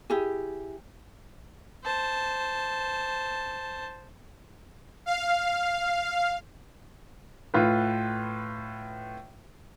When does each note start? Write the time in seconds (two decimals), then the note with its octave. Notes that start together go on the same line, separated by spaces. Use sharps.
0.10 E4 G4 G#4
1.84 C5 A5
5.06 F5
7.54 A2 F4 B4